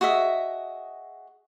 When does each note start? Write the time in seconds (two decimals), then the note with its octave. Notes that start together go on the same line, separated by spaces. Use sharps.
0.01 F#4 G#4 D#5 E5